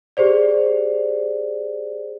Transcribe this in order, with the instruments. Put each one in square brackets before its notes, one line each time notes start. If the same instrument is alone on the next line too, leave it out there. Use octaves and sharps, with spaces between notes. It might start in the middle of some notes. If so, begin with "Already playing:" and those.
[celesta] G4 G#4 C5 D5